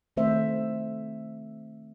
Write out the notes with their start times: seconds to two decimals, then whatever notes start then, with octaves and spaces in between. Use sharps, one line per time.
0.17 D#3 A3 C4 C5 E5